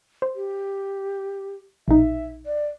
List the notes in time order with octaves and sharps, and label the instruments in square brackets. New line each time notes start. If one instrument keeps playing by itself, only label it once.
[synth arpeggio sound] C5
[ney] G4
[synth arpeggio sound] A#1 B2 D#4 [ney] E5
[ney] D5